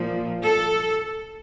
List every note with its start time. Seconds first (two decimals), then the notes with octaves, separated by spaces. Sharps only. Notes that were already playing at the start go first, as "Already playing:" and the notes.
Already playing: A#2 F3
0.43 A4